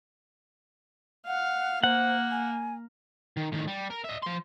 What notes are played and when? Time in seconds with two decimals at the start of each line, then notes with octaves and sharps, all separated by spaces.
1.27 F5 F#5
1.84 A#3 C5 F#5
2.31 G#5
3.37 D#3
3.52 A2 D#3
3.68 G3
3.90 A#4
4.05 D#5 E5
4.23 F3 C6